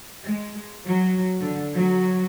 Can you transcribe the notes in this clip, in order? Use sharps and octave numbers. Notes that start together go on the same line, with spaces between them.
G#3
F#3
D3
F#3